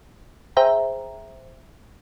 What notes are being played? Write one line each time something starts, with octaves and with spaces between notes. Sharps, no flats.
G#4 C5 E5 G5 A#5